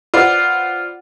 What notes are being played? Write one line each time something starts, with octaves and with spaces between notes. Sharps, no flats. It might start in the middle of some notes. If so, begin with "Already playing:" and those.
F4 B4 C5 D5 F#5